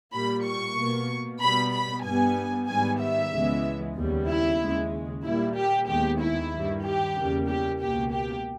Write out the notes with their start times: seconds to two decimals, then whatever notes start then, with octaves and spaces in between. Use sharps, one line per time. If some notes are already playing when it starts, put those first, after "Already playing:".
0.12 A#2 G3 A#3 B5
0.44 C#6
0.76 B2 A#3
1.40 B2 G3 B3 B5
1.72 B5
2.04 G2 G3 B3 G#5
2.68 G#2 D#3 G3 B3 G#5
3.00 E5
3.32 C#2 C#3 E3 G#3 B3
3.96 D#2 C#3 G3 B3
4.28 E4
4.60 D#2 C#3 G#3
5.24 A#2 G3 A#3 E4
5.56 G4
5.88 D#2 D#3 G#3 B3 G4
6.20 E4
6.52 G2 D#3 G3
6.83 G4
7.16 E2 C#3 G3 A#3
7.47 G4
7.79 C#2 B2 A#3 G4
8.12 G4